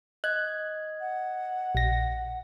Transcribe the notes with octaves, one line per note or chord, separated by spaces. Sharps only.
D#5 F#6 G#6
F#5
A#1 A#6